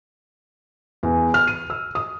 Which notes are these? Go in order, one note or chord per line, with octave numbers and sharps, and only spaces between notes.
E2
F6
D#7
E6
D#6